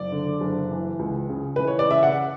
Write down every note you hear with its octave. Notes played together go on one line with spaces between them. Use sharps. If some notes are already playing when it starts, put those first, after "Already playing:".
Already playing: F#1 D5
D3
F#1
E3
C#2
C#3
E3 B4
C#5
D5
C#3 E5
F#5